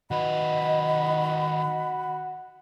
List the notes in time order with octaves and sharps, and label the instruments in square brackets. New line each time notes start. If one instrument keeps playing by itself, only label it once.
[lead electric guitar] D#3 B4 [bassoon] F#4 [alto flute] D#5 [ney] B5